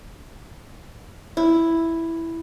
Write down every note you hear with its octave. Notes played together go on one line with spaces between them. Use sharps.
E4